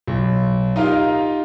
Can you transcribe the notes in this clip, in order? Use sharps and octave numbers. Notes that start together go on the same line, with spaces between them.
B1
D#4 F4 G4 A#4 D#5 F5